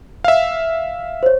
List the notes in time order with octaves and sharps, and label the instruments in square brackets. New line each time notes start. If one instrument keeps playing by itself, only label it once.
[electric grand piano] E5 F5
[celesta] C5 C#5